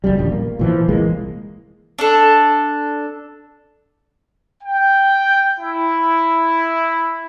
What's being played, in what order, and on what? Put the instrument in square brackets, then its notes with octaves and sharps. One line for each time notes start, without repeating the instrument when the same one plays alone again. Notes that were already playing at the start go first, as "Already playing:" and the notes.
[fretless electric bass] F#1 F#2 G3
D#1 A#1
A#3
A#2 E3 F3
C2 E3 G#3 A#3
[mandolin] D4 A4
[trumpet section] G5
E4